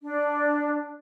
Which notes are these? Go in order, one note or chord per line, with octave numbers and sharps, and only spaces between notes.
D4